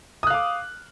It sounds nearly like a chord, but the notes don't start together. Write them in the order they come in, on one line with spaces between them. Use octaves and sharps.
D#6 F#6 F5 D6